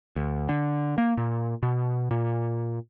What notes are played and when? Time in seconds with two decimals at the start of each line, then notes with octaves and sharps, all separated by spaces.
0.16 D2
0.49 D3
0.98 A#3
1.17 A#2
1.63 B2
2.11 A#2